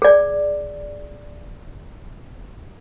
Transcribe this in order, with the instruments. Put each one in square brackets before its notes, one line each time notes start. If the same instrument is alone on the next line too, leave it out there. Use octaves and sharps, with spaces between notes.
[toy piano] G#4 D5